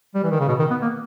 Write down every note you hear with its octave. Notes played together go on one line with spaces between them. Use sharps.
G3
E3
D#3
C#3
B2
D#3
B3
A#3